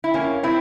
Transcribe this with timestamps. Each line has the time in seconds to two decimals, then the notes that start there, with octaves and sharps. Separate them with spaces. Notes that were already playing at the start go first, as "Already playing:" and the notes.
0.04 E4
0.14 F2 A#3 C#4
0.43 C3 C4 E4